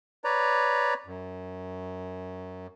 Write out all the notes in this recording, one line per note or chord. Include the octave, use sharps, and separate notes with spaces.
B4 C#5 D5 A#5
F#2